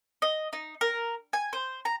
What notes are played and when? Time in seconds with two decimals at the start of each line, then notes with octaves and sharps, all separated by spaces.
0.22 D#5
0.53 D#4
0.81 A#4
1.33 G#5
1.53 C5
1.85 A#5